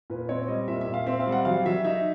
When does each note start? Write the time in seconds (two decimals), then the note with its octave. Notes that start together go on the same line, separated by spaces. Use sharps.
0.10 A#2 B4
0.29 C4 C#5
0.48 G3 D#5
0.68 A#2 E5
0.81 E5
0.87 A#2
0.94 F5
1.06 C4 E5
1.20 F5
1.27 G3
1.32 F#5
1.45 F#3 F5
1.66 F#3 E5
1.85 D#4 E5